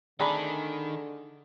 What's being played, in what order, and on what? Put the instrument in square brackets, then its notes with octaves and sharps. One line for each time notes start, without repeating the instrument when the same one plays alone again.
[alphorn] D3 [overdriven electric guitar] D#3 [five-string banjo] A3 C4 D4 [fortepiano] G#4 A#5 B5